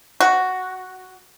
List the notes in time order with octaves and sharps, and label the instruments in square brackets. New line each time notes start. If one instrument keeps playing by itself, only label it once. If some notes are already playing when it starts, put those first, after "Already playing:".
[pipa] F#4